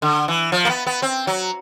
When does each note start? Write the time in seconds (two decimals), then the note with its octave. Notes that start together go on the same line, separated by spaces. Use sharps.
0.02 D3
0.28 E3
0.52 F3
0.65 A#3
0.69 B3
0.86 B3
1.02 C4
1.27 F#3